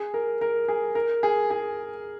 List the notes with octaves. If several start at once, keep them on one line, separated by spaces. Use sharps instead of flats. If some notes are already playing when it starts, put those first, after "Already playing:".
Already playing: G#4
A#4
A#4
G#4
A#4
G#4
G#4